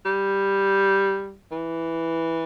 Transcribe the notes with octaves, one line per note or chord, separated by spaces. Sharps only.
G3
E3